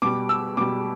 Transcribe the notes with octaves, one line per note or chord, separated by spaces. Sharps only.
B2 G3 D6
E6
B2 G3 D6